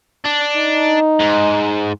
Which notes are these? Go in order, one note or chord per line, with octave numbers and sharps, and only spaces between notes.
D4
D#4
G#2